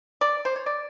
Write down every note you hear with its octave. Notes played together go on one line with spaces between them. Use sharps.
D5
C5
C#5
D5